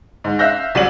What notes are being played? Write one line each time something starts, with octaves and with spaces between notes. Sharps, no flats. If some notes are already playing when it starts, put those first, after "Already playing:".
G#2
E5 F5 E6 F#6 G6 A#6
C2 F#3 D5 D#7 F#7